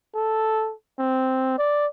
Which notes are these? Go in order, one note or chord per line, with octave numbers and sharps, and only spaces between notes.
A4
C4
D5